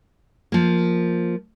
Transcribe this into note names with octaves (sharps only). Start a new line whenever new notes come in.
F3 A#3